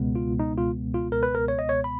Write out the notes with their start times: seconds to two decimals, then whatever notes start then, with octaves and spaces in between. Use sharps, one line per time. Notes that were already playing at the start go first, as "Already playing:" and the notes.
Already playing: C#2 B2 G#3 B3
0.15 F4
0.39 D#4
0.58 F4
0.94 F4
1.12 A#4
1.23 B4
1.35 A#4
1.48 C#5
1.59 D#5
1.69 C#5
1.84 B5